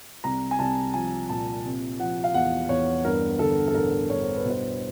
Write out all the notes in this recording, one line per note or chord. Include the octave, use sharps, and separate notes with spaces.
C2 A#5
G#5
C2 A5
F3 G#5
A#2 A5
C3
F3 F#5
F5
E2 F#5
E2 C#5
G2 A#4
D3 A4
A4
A1 A#4
G2 C#5
C5
B4
B2
C5